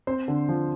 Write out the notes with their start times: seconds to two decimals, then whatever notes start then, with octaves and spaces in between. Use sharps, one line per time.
0.07 C4 C5
0.28 D3
0.49 F3